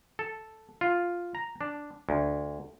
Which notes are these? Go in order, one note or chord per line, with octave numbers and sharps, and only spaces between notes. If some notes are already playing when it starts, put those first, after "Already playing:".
A4
F4
A#5
D4
D2